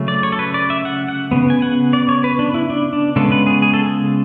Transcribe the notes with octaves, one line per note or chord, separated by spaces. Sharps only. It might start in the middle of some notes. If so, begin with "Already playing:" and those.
Already playing: C#3 F#3 A3 C#4
D5
C#5
A4
B4
D5
E5
F#5
F#5
C#3 G#3 B3
G#5
F#5
D5
C#5
B4
D4
E4
D4
D4
C#3 G#3 B3 A4
B4
G#4
G#4
A4
G#4